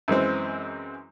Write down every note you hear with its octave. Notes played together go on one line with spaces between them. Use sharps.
F#2 E3 G#3 C4